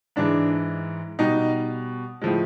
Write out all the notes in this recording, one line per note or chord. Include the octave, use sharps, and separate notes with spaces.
G#2 E3 G#3 D4
B2 G3 D#4
A2 F3 G#3